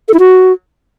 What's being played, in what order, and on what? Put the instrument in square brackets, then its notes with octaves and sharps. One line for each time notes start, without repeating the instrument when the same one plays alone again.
[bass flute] A4
E4
F#4